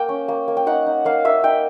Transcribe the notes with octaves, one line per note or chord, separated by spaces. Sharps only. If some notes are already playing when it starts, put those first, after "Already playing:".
Already playing: A#3 G5
C#4
A#3
A#3
G5
D#4 F#5
D#4
A#3 F5
A#3 E5
D#4 G5